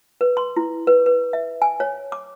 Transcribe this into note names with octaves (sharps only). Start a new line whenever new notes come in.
B4
C6
E4
B4
B4
E5
G#5
C#5
D6